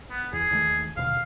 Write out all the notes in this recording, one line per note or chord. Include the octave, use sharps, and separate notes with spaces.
B3
E2 G#4
D#2 D#3 A3
D#2 B2 D3 F5